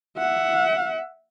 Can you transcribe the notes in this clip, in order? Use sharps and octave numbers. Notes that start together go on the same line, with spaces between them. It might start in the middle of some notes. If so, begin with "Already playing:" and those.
E5 F#5